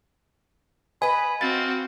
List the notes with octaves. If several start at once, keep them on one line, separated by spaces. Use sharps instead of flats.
B4 D#5 G#5 B5
C4 F#4 F5 A6